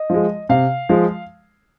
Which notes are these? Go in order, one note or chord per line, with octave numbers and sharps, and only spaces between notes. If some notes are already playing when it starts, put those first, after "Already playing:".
Already playing: D#5
F3 G#3
C3 F5
F3 G#3